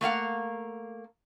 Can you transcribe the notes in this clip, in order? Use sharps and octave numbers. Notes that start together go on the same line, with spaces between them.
A3 A#3 F5 F#5